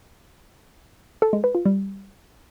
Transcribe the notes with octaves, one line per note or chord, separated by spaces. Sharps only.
A4
G#3
B4
F4
G3